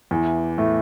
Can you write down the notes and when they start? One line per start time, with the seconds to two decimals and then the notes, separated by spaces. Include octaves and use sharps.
0.11 E2 E3
0.58 A2 A3